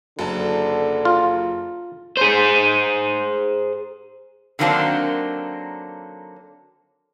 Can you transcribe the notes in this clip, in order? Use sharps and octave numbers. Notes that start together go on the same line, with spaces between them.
F#1 D3 F#3 A5
F4
G#4 C5
D3 D#3 F#3 A#3 C4 D4